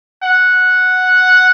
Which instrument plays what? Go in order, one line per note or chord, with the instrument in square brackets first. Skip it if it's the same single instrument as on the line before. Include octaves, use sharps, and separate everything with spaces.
[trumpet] F#5